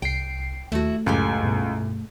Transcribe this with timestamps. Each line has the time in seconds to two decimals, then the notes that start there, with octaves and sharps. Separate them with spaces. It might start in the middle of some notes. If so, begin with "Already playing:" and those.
0.02 C2 G5 C7
0.72 D#2 A3 E4 F#4
1.06 C#2 F#2 A2 G4 G#5
1.43 G2 B2